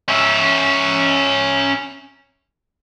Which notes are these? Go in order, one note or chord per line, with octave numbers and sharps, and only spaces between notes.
C#4 E5